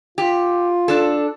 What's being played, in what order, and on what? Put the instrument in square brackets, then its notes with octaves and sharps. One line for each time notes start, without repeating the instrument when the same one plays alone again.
[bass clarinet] F4 [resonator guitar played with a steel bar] G4
[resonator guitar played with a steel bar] D4 A4